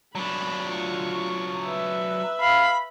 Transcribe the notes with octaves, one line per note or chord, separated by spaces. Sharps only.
F#3 D4 B5
F4 C#6
B4 E5
F5 B5